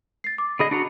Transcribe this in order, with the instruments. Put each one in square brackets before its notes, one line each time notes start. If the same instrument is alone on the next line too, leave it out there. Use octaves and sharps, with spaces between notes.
[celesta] A6 C7
D6
[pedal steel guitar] D3 G#4 D#5 [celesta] B5
[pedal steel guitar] D4 F#4 A#5